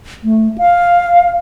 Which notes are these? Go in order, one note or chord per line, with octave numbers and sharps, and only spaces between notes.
A3
F5